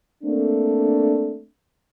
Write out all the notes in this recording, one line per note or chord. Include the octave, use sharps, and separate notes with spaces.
A3 A#3 C4 D4